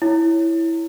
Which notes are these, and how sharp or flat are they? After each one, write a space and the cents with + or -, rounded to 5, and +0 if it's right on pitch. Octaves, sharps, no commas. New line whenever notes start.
E4 +0 C#5 +0